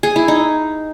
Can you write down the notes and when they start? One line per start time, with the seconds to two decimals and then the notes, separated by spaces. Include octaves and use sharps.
0.03 G#4
0.16 E4
0.28 D#4